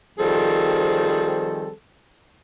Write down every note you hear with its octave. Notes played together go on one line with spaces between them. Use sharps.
D#3 F3 G3 C4 G#4 A4